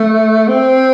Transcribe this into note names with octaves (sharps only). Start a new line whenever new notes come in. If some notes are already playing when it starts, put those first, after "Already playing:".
Already playing: A3
C4